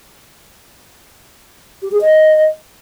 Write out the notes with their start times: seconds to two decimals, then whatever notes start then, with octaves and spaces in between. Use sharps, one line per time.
1.82 G4
1.92 G#4
2.01 D#5